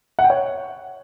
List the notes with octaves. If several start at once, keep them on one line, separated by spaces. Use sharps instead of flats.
F#5
G5
C#5